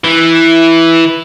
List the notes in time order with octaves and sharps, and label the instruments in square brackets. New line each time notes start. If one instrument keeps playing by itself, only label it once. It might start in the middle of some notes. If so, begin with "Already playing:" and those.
[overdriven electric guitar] E3